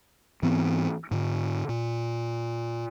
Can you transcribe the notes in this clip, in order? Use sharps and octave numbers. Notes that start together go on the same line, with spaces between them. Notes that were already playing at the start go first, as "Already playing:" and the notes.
G#2 E3 B3 C4
G#2 D3
A#2